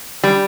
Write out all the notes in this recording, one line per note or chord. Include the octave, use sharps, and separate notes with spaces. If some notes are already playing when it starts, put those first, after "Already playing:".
G3